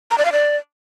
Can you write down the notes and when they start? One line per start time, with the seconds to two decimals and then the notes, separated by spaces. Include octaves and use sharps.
0.11 A#5
0.18 D5
0.25 F5
0.32 D5